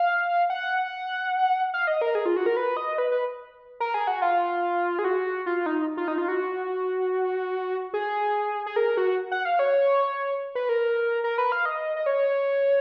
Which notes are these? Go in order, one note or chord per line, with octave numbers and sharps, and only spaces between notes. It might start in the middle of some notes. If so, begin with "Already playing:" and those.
Already playing: F5
F#5
F5
D#5
A#4
G#4
F4
F#4
A#4
B4
D#5
B4
B4
A#4
G#4
F#4
F4
G#4
F#4
F4
D#4
F4
D#4
F4
F#4
G#4
G#4
A#4
F#4
F#5
F5
C#5
B4
A#4
A#4
B4
F5
D#5
D#5
C#5